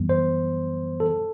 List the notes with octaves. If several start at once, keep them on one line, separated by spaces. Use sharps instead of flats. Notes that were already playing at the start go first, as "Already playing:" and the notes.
Already playing: F#2 E3 G3 B3
C5
A4